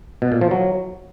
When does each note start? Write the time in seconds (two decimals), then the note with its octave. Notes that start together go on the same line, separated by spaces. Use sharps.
0.22 B2
0.32 A#2
0.41 F3
0.51 F#3